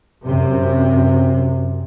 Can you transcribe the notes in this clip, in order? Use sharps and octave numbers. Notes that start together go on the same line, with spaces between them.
F#2 C3